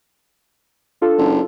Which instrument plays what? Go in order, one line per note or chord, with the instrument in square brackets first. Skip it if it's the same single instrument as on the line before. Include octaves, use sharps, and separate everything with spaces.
[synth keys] D4 F4 A4
[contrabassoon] F#1